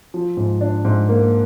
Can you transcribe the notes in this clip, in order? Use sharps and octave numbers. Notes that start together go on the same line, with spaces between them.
F3
G#2
D4
G#2
A#3